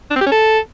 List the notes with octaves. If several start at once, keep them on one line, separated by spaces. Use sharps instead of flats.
D4
C4
G4
C#4
A4